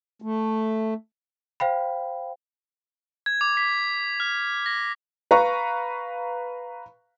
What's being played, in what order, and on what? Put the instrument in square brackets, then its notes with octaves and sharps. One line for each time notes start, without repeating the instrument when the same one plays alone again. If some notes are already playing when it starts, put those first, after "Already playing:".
[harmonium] A3
[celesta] C5 F5 G5 B5
[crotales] G#6
D6
B6
F6
A#6
[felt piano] B4 F5 A#5 C#6